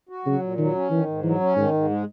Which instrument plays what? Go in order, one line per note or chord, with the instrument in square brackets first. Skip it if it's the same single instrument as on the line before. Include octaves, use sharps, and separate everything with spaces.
[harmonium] F#4
[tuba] C#3 [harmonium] F#3
[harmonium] A#2
[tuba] D#3 [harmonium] F#3
[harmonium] C#4
[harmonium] D#3 [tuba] E3
[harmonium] G#2
[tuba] E3 [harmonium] F#3
[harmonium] C#4
[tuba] G#2 [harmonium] D#3
[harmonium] G#2
G#3